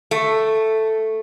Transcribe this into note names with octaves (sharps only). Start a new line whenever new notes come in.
A3